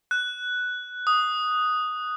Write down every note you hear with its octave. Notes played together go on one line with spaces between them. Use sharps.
F#6
D#6